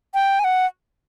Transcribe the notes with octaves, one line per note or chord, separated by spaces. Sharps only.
G5
G#5
F#5